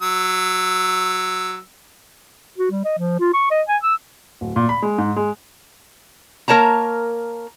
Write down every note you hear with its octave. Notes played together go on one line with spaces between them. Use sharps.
F#3 E6
F#4
G3
D#5
F3
F4
C#6
D#5
G#5
E6
D1
A#2
B5
G#3
G#2
G#3
A#3 A#4 C#5 A5 A#5